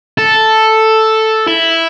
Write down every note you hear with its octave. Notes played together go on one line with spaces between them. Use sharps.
A4
E4